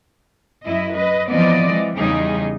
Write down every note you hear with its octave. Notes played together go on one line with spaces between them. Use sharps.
F#2 E4 D#5
B4 D#5
E3 F3 B3 C4 D5 D#5
E3 G#3
E2 C#3 G3 D#4 G#4